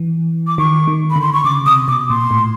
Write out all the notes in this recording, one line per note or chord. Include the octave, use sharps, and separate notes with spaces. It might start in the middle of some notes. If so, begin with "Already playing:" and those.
Already playing: E3
D6
D#3 C#6
D#3
B5
D3
C6
C#6
C#3 D6
C3 D#6
B2 D6
A#2 C6
A2